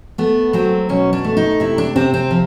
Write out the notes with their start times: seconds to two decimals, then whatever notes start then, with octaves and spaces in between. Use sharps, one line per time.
0.18 A3 B3
0.53 F#3 C4
0.89 B2 C#4
1.13 D4
1.24 A3
1.37 D#4
1.60 C3 E4
1.78 D4
1.96 C3 C4
2.14 C4
2.31 F3